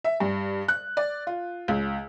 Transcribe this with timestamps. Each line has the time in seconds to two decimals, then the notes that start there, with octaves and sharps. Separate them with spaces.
0.04 E5
0.20 G2
0.68 F#6
0.97 D5
1.27 F4
1.68 C#2